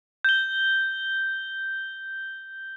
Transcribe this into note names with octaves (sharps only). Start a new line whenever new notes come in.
G6 G7